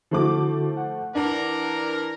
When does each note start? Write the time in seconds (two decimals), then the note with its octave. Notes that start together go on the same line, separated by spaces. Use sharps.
0.11 D3 F3 A3 E4 F#4 D6
0.77 F#5
1.15 E3 D4 A#4